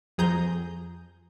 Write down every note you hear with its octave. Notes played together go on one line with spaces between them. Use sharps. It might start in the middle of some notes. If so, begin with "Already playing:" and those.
F2 G#4 A#5 G6